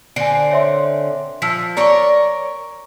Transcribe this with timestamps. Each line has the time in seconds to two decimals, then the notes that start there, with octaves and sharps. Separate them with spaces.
0.16 D3 C4 G#5 D7
0.51 C#5 E5 C6
1.42 F3 E6 B6
1.77 A#4 C#5 D5 A#5 C#6